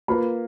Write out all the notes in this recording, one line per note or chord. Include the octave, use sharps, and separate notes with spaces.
A#3 F4 B4 B5